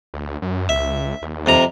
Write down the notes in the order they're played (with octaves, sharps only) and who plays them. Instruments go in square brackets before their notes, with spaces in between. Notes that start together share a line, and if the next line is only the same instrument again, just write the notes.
[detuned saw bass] D2
F#2
[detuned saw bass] C#2 [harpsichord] E5
[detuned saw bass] D#2
[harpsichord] F2 C3 A#5